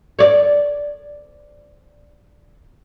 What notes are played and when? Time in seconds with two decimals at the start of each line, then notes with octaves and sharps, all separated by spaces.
0.19 C#5 D5